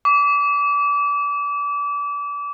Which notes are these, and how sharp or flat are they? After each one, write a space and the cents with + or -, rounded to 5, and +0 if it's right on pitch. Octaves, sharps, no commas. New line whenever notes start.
D6 -30